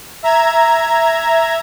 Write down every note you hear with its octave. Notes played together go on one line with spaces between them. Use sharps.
E5 A#5 G#6